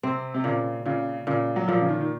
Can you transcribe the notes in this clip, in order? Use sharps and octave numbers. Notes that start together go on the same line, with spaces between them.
C3 C4
C3
A#2 C#3
A#2 C#3
A#2 C#3
F#3
A#2 F3
C#3
D#3
D#3